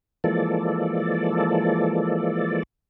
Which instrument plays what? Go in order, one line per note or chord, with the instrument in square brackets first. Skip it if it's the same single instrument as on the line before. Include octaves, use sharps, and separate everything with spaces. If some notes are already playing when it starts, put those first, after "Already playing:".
[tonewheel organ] E3 F3 G#3 A#3 A4 D5